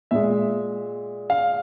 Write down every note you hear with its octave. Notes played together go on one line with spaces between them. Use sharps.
A#2 G#3 E5
F5